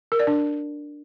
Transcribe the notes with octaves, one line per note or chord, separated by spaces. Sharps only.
A#4
D5
D4